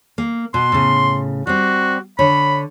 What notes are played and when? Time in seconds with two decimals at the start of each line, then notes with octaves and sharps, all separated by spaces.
0.18 A#3
0.54 B2 C6
0.72 A2 C#3
1.47 G3 C4 F#4
2.19 D3 C#5 B5